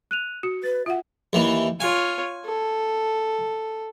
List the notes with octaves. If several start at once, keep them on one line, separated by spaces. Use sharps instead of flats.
F#6 D#7 F7
F#4 C#7
B4 A6
F4 E5 F#5
D#2 E3
F4 C#5 G#5
A4